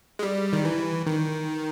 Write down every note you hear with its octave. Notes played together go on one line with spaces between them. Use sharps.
G#3
G3
D#3
E3
D#3